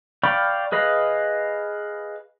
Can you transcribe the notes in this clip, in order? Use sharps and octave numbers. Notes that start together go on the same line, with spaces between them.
D5 F5 G5 B5 C#6
G#4 B4 D#5 F5